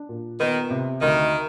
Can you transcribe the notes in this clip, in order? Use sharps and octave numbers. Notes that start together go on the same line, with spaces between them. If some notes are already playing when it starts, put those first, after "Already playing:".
Already playing: D4
A#2
D#3 B3
C3
D2 D#3